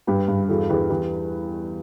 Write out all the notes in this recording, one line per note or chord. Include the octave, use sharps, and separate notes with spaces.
G2 G4 B4
G2
E2 F#4 A4
E2 G4 B4
E2 G4 B4